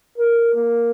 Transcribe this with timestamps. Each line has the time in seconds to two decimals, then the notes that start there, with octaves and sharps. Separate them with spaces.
0.18 A#4
0.54 A#3